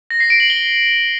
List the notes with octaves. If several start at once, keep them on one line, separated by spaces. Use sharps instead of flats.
A#6
C7
D7
F#7
G7